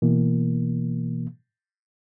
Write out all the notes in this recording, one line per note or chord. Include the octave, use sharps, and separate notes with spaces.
B2 E3 A#3